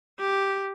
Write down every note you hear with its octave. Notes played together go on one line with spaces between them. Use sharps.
G4